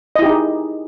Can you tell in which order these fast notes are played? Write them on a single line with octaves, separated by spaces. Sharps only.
D#5 E4 G4 D#4 G#4